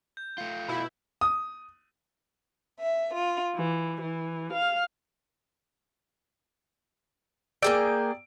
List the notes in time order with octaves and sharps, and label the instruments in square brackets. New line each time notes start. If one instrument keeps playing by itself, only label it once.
[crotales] G6
[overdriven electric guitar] A3 F4
[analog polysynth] B2 E4 [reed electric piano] B5
[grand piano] D#6
[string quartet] E5
F4
E3
E3
F5
[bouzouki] A#3 G#4 G5 [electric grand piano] D5 E6 D7